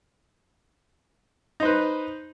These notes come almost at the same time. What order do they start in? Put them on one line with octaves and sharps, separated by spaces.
D#4 C5 B4